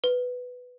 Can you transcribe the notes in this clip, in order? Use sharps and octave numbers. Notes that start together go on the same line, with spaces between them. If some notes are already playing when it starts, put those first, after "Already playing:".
B4